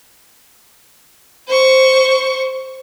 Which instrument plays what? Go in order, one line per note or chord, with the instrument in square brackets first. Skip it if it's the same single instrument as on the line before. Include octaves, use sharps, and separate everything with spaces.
[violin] C5 C#6